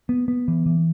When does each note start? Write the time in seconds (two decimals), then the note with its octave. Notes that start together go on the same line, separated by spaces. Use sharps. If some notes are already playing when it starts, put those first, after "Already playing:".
0.09 B3
0.28 B3
0.48 E3
0.66 E3